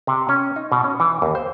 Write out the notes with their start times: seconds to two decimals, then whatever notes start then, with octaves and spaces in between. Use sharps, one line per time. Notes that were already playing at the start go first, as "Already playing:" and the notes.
0.07 C3
0.29 C#4
0.56 D#4
0.72 B2
0.84 C#4
1.00 E3
1.22 D#2
1.35 C5